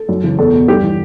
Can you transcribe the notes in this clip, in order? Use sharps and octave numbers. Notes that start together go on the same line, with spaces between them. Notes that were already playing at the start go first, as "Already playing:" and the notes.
Already playing: A4
F#2
C#3 E3
E2 A4
B2
G2 G4
E3